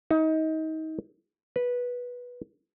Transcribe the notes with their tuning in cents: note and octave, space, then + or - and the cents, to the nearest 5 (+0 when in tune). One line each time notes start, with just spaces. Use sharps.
D#4 +25
B4 -10